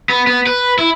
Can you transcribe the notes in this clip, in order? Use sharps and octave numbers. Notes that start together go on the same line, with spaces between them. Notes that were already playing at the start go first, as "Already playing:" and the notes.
B3
B3
B4
E4